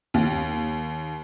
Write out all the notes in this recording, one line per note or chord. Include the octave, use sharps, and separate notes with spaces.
D#2